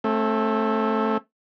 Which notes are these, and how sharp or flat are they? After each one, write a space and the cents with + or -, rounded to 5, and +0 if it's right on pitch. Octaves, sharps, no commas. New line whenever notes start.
A3 +0 C4 +40